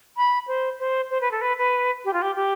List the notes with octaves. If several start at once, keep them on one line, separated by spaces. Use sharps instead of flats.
B5
C5
C5
C5
B4
A4
B4
B4
G4
F4
G4
G4